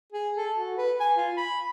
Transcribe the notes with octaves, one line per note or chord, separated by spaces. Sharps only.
G#4
A4
F#4
B4
G#5
F4
B5